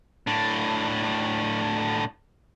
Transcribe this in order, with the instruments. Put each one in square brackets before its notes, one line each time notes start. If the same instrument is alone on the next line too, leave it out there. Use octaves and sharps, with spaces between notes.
[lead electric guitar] A2 D4